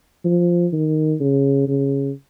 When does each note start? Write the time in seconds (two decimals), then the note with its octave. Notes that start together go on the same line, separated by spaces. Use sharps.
0.25 F3
0.73 D#3
1.20 C#3
1.68 C#3